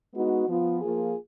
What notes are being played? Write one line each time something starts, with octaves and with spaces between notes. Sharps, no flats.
G#3 B3 D#4 F#4
F3 B3 F4
F3 A#3 F4 G#4